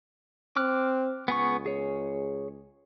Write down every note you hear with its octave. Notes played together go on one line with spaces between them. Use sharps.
C4 D6 F6 F#6
C#2 B3 G#4 C#6
G#4 C#5